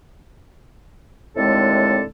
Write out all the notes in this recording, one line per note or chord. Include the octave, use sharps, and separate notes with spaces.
D#2 A2 D3 G#3 C4 A4